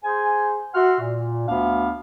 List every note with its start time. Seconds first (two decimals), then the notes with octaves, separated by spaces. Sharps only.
0.04 G#4 C5 G#5
0.74 F#4 E5 F#5 C6 F6
0.99 A#2
1.48 D2 B3 D4 F5